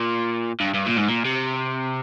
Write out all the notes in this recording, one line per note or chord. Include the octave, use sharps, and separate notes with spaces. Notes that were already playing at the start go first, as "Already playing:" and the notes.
Already playing: A#2
G2
G2
A#2
G#2
A#2
C3